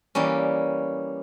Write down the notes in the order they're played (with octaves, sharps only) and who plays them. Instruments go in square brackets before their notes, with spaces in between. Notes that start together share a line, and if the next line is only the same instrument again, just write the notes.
[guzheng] E3 G3 A#3 C#4